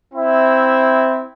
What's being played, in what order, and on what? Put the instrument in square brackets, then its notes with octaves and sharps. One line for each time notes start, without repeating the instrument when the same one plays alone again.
[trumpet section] C4 E4 E5